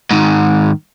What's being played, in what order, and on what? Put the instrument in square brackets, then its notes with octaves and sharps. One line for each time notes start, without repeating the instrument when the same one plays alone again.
[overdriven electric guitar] G#2 D#3